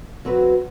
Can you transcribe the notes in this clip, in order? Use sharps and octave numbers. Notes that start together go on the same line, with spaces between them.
F#3 C4 F#4 B4